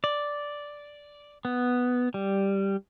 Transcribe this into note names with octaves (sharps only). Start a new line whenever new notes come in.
D5
B3
G3